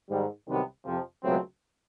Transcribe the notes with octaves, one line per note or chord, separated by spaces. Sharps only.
G#2 D#3 G3
C2 C3 D#3 F#3 B3
F2 C3 F3
C#2 B2 F#3 A3 C4